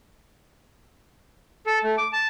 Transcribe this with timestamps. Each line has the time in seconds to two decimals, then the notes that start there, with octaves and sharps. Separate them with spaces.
1.66 A4
1.84 A3
1.98 D6
2.13 A5